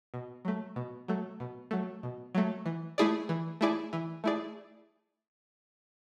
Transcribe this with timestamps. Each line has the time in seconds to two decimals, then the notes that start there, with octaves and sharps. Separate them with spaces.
0.14 B2
0.45 F#3 A3
0.76 B2
1.08 F#3 A3
1.40 B2
1.71 F#3 A3
2.03 B2
2.35 F#3 A3
2.66 E3
2.98 A3 E4 G#4 D5
3.29 E3
3.61 A3 E4 G#4 D5
3.93 E3
4.24 A3 E4 G#4 D5